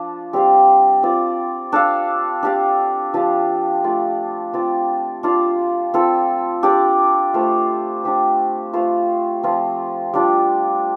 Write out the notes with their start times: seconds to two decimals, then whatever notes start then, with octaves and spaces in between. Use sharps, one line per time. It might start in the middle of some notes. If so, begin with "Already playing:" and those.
Already playing: F3 D4 F4
0.33 G3 C4 G4 F5
1.03 C4 F4 D5
1.72 D4 A4 F5
2.43 D4 G4 D5 F5
3.14 F3 D4 G4 F5
3.84 A3 F4 D5
4.53 C4 F4 D5
5.23 D4 F4 D5 F5
5.94 C4 F4 A4
6.63 D4 G4 D5
7.34 A3 F4 C5 F5
8.04 D4 G4 C5
8.73 A3 F4 C5 F5
9.43 F3 C4 F4
10.13 G3 D4 F4